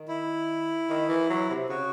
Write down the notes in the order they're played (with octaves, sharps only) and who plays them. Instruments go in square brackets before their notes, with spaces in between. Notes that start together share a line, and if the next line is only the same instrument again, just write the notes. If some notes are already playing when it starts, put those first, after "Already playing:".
Already playing: [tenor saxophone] D#3
[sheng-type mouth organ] E4
[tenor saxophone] D#3
E3
F#3
C3
[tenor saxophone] C#3 [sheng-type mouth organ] F#4